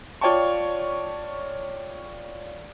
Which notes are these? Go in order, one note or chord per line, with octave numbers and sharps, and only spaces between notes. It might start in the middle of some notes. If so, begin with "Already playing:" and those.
F4 C#5 D5 G5 A5 C#6